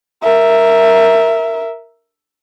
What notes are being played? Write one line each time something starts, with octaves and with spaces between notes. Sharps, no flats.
A#4 E5